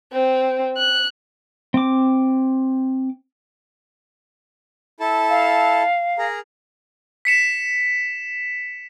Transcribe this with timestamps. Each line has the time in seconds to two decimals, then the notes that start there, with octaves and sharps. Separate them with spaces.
0.13 C4
0.77 F#6
1.74 C4 D6
5.00 E4 A4 A5
5.30 F5
6.18 G#4 A#4 A#5
7.25 B6 C#7 E7